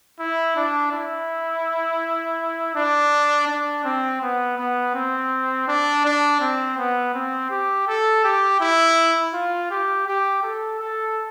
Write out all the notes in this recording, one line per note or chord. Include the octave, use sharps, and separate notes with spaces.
E4
D4
E4
D4
D4
C4
B3
B3
C4
D4
D4
C4
B3
C4
G4
A4
G4
E4
F4
G4
G4
A4
A4